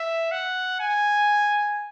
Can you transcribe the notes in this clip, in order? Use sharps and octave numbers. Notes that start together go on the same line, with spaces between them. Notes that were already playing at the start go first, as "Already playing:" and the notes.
Already playing: E5
F#5
G#5